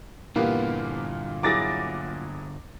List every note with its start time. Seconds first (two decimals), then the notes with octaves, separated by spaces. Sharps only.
0.36 G2 A#2 D3 E3 A#3 B3 F4 G4
1.43 F#3 E4 G#4 D6 A6 A#6